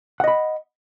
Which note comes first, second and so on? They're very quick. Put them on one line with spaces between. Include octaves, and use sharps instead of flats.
F#5 D#5 B5